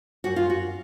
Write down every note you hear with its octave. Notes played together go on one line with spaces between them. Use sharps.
F#2 F#4
F4
F#4